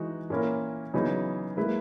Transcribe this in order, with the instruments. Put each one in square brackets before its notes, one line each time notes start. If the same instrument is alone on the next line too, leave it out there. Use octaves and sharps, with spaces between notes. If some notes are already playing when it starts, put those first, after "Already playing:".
Already playing: [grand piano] E3 [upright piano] G#3 D#4 F#4
[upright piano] A#2 A#3 C#4 E4 A#4
[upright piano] C#3 E3 B3 D#4 G#4 [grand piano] F#3
[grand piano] G#3 [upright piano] A#3 E4 B4